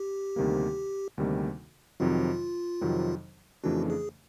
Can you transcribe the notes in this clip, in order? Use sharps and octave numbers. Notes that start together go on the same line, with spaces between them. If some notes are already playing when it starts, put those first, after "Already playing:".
Already playing: G4
D2 C3 D#3 G3 A#3
D2 C3 D#3 G3 A#3
F2 C3 D#3 F#3 F4
F2 C3 D#3 F#3
F2 C#3 E3 A3 D4 F#4
G#4